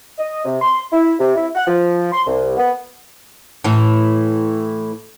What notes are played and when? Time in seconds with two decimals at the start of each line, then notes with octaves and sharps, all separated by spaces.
0.18 D#5
0.45 C3
0.62 C6
0.92 E4
1.20 C3
1.36 E4
1.55 F#5
1.67 F3
2.12 C6
2.26 C2
2.57 B3
3.64 A2 E3